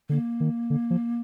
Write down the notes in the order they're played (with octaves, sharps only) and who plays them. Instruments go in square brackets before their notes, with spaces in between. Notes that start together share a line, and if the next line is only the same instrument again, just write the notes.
[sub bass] D3 [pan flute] A#3
[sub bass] D#3
D3
F3